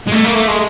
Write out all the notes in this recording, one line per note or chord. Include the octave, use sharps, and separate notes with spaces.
G#3
A3
A#3
A3
G#3